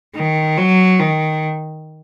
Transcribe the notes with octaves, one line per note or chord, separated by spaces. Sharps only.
D#3
F#3
D#3